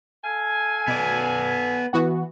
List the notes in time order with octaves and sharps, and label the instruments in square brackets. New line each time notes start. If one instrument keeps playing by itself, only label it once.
[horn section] A4 F5 G#5
[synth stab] B2 [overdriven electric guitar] B3 D5
[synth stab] E3 B3 F#4